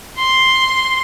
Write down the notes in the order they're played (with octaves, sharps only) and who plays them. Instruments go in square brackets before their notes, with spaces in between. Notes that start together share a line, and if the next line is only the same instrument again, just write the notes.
[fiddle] C6